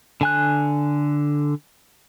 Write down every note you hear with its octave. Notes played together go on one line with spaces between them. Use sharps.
D3 G#5 F#6